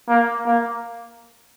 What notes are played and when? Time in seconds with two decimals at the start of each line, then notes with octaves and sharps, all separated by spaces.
0.08 A#3
0.45 A#3